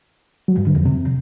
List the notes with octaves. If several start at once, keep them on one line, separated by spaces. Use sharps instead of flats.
F#3
G2
D3
F2
C3